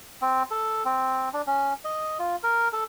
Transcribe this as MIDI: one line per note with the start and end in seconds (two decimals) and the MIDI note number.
0.22 0.43 60
0.51 0.83 69
0.85 1.29 60
1.34 1.42 62
1.47 1.73 61
1.84 2.18 75
2.19 2.36 65
2.43 2.68 70
2.73 2.84 69